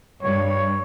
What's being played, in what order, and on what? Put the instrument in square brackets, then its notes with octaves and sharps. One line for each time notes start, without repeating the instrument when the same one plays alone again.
[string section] G2 [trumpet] C#5